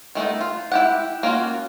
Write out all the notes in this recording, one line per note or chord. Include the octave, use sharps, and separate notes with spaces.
D#3 A3 B3 D#4
F4
E4 G4 F#5
A#3 C#4 F4 F#4